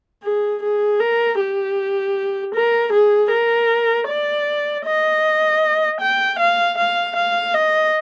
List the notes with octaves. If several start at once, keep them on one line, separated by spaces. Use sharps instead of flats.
G#4
G#4
A#4
G4
A#4
G#4
A#4
D5
D#5
G5
F5
F5
F5
D#5